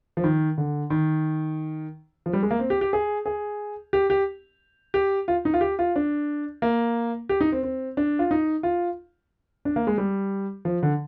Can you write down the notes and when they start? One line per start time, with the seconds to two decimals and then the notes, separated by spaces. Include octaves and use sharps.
0.17 F3
0.24 D#3
0.58 D3
0.90 D#3
2.26 F3
2.33 G3
2.43 G#3
2.51 A#3
2.60 C4
2.70 G4
2.81 G4
2.93 G#4
3.26 G#4
3.93 G4
4.10 G4
4.94 G4
5.28 F4
5.45 D#4
5.54 F4
5.61 G4
5.79 F4
5.96 D4
6.62 A#3
7.29 G4
7.41 D#4
7.52 C4
7.63 C4
7.97 D4
8.19 F4
8.31 D#4
8.63 F4
9.65 D4
9.76 A#3
9.87 G#3
9.98 G3
10.65 F3
10.83 D3